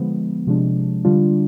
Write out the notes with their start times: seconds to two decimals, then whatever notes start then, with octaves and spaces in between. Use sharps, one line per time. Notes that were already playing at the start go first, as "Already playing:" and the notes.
Already playing: D3 F3 G#3 B3
0.47 C3 F3 G#3 D4
1.05 D3 G3 D4 F4